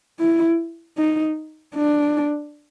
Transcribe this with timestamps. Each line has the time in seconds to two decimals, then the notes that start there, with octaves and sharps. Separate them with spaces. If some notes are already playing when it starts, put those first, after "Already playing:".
0.20 E4
0.98 D#4
1.75 D4